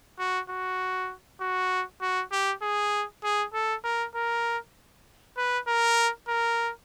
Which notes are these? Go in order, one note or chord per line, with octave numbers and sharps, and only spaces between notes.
F#4
F#4
F#4
F#4
G4
G#4
G#4
A4
A#4
A#4
B4
A#4
A#4